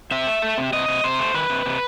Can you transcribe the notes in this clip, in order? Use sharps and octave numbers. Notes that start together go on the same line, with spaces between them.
C3 E5
A3
A3
C3
C3 D#5
C3
C3 C5
A3
D#3 B4
C3
C3